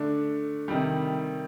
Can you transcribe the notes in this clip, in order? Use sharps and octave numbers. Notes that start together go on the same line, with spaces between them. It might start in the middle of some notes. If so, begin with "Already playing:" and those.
Already playing: D3 A3 D4
C3 D#3 G3